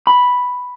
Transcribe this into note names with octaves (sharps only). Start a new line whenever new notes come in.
B5